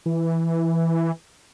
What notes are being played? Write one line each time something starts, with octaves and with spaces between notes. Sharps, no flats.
E3